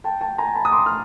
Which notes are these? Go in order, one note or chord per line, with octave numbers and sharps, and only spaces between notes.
G5 A5
G5 A5
G#5 A#5
A5 B5
D#6
C6 D6
F6